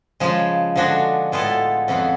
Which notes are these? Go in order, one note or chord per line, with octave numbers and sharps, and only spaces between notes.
C#3 F3 G#3
D3 F3 G#3 D4 F#4
A2 G#3 B3 F4 A4
F2 C#3 F3 B3 F4